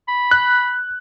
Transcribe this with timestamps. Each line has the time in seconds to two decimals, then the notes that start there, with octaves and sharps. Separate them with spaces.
0.08 B5
0.31 F#6